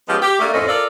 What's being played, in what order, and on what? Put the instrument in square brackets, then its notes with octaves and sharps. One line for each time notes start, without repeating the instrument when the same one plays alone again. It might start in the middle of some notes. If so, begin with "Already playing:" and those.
[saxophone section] F3 G#3 B3 C#4 G4
G4
A3 A#3 D4
F2 A2 C4 C#4 A4 D#5
F4 A4 A#4 D5